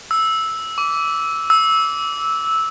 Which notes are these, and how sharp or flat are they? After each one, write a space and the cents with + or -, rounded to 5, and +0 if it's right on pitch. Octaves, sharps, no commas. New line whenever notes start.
E6 -5
D6 -25
E6 -10